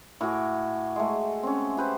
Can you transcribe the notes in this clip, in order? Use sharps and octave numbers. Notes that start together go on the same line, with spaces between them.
A2 F#4 G#5 D6
G#3 A3
C4 C#4
G4 B4 C5